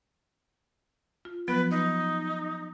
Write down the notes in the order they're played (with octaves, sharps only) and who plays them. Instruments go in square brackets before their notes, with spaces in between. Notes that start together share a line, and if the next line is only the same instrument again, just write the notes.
[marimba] F4
[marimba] F3 F#3 B3 [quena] B4
[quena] D#4